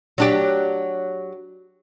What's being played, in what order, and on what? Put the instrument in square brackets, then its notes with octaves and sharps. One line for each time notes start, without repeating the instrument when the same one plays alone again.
[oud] F#3 D4 G4